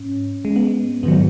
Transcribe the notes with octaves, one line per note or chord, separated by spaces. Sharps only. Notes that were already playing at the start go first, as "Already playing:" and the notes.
Already playing: G#2 C#4
G#3
B3
G#2 D#3 F#3 B3